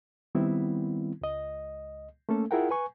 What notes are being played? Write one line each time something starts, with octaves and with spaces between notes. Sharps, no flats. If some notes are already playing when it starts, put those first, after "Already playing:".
D#3 G3 B3 C4 E4
C#2 D#5
A3 A#3 C#4 A4
E4 F4 G#4 A#4 F#5 G5
B4 G#5 C#6